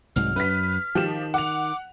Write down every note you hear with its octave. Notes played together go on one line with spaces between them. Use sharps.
C2 G#2 F#3 F6
F#2 B4 B6
D#3 F3 G4 E7
F#5 D6 F7